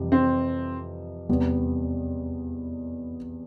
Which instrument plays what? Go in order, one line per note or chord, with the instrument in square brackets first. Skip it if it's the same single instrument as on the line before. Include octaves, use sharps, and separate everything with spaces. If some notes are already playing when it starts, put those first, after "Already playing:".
Already playing: [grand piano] F2 C3 E3 G3
[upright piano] C4
[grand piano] E2 C3 G3 B3